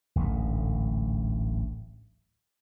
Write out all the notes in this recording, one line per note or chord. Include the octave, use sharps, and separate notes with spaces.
D1 A1 D2 G#2